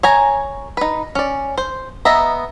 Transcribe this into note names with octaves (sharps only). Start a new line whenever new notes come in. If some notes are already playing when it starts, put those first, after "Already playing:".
C#5 G#5 A#5
D#4 B4
C#4 D5
C5
B3 D#5 E5 A#5